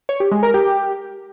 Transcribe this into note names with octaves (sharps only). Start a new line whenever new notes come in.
C#5
G4
G#3
A#4
G4